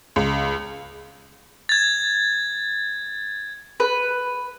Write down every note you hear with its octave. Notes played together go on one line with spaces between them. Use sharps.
C#2
G#6 A6
B4